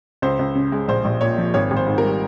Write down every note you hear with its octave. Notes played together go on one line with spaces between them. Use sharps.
C#2 C5
C#2
C#3
G#3
A#1 C5
A#1
A#2 C#5
F3
G#1 C#5
G#1
C5
G#2
A#4
G3